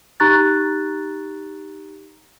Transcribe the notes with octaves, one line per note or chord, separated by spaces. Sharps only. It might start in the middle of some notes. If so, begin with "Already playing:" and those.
D#4 G4 A#5 C#6 F#6 A6